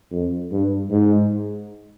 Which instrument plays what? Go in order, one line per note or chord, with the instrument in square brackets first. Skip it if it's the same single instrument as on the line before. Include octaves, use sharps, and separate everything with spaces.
[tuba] F2
G2
G#2